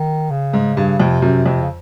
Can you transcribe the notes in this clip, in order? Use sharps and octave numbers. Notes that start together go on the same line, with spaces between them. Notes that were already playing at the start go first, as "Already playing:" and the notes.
Already playing: D#3
C#3
G#2
G2
F2 C3
F#2
F2
C#3